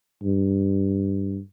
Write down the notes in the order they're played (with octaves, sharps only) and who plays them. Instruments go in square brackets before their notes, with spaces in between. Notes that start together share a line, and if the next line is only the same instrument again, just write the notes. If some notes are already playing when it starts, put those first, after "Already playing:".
[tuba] G2